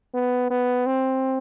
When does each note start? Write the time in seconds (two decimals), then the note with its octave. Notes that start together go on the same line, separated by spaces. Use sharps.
0.14 B3
0.51 B3
0.86 C4